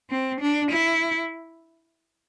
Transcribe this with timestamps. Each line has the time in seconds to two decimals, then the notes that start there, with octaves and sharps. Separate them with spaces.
0.10 C4
0.41 D4
0.72 E4